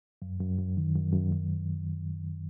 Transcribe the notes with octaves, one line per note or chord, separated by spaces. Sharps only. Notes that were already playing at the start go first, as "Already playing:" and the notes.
F#2
F#2
F#2
D#3
F#2
F#2
F#2